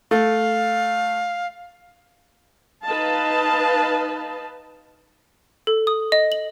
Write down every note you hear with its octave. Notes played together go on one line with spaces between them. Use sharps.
A3 F5
D#4 B4 D#5 F5 A5
A4
D#6
D#5
F#7